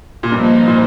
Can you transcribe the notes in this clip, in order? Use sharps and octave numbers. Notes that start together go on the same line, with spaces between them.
A#2
G2 F3 A#3 D#4 C5
A#2